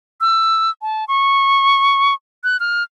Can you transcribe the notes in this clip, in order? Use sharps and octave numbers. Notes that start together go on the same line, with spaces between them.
E6
A5
C#6
F#6
F6